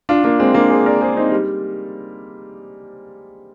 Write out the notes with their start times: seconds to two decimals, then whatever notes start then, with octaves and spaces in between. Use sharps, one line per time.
0.09 D4 F4
0.24 A#3 D4
0.39 G#3 C4
0.54 A#3 D4
0.70 G#4 C5
0.86 A#4 D5
1.01 G#4 C5
1.17 C4 D#4
1.32 G3